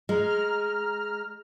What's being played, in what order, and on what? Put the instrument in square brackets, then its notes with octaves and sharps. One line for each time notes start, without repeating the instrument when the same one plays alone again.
[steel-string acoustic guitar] G#3 [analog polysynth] A#5 F6